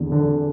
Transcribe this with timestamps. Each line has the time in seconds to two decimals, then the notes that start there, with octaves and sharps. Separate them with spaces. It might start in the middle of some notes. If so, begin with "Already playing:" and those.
Already playing: E2 D3
0.12 D3